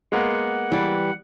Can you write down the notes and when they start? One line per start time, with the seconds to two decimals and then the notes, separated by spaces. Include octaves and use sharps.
0.12 G#3 A#3 B3 F#5
0.72 E3 G3